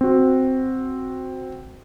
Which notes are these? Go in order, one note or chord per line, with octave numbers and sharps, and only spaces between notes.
C4 F#4